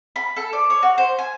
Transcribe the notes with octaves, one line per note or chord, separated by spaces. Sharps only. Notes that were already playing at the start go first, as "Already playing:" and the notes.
B5
A4
D5
C#5
F#4
C5
G#5